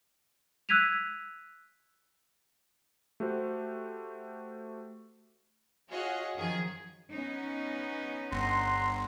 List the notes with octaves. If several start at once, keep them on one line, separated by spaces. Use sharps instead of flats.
E6 F#6 G#6 B6 D#7 F7
A3 F#4 G4 C5
F4 F#4 G#4 C#5 D#5 F#5
F#2 D#3 F3 G#4 G#5
B3 C#4 D#4
G1 F#5 A#5 C6